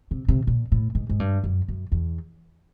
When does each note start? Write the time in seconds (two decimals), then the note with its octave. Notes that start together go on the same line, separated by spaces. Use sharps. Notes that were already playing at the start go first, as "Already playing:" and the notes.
0.11 C3
0.28 C3
0.47 A#2
0.72 A2
0.95 G#2
1.09 G#2
1.19 G2
1.44 F#2
1.68 F#2
1.92 E2